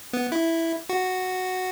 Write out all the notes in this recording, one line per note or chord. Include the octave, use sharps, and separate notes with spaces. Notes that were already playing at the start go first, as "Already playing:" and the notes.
B3
E4
F#4